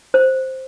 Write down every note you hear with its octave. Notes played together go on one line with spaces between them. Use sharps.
C5